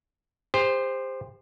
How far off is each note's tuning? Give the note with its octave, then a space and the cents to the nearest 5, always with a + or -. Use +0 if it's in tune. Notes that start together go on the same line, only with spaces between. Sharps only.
G4 +40 C5 +0